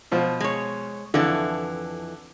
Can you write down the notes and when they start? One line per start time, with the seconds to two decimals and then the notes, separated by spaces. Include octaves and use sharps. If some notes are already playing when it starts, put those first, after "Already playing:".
0.12 B2 F3
0.40 G#3 C#5
1.14 F2 D3 E3